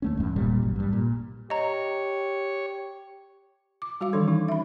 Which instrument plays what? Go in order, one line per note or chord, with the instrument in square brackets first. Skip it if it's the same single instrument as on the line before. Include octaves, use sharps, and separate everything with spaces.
[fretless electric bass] D#2 A3 C#4
D1 E2 G2
E1 A#2 G3
A1 F#2
G2 G3
A#2
[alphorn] G4 [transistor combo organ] C#5 [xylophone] D#5 A#5
[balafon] D6
G3 F#4 F5 D6
D#3 E3 D4 A4
C#4 D#4
E5 B5